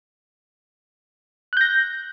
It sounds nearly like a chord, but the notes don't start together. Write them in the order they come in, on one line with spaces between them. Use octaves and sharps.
F#6 G6 A#6